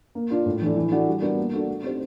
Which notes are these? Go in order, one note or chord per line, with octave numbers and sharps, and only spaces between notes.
A#3
D4 F4
A2
E3 A3 D4
E3
A3 D4 F#4
G3
B3 D4 F#4 A#4
A#3
D4 F#4 A4
A3
C4 D#4 G4 C5